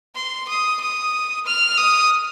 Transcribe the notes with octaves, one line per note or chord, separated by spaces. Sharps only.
C6
D#6
D#6
F6
D#6